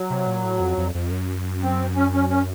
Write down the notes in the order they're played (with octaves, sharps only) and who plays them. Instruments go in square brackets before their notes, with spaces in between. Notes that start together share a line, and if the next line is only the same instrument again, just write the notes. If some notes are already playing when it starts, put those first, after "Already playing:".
Already playing: [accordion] F#3
[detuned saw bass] C3
A#2
A2
F2
F2
F2
F#2
[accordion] C4
C#4
C#4
C#4